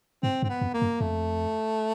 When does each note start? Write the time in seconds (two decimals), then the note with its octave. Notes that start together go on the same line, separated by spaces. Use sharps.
0.23 G#2 C4
0.42 G2 C4
0.49 B3
0.61 F2
0.74 A#3
0.82 F#2
1.00 F2 A3